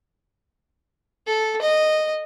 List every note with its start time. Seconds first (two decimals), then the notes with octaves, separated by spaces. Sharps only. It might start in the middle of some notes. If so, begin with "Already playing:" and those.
1.27 A4
1.62 D#5